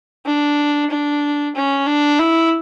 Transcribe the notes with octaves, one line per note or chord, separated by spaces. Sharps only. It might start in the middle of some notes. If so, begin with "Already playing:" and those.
D4
D4
C#4
D4
E4